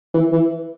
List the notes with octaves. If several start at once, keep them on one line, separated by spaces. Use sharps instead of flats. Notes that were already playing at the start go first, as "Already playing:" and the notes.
E3
E3